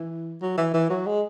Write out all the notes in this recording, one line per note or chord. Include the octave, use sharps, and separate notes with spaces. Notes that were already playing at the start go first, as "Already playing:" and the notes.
Already playing: E3
F#3
E3
E3
F#3
G#3